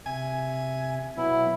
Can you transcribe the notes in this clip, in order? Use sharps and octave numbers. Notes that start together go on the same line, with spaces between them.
C3 E5 G#5
B2 F#3 B3 E4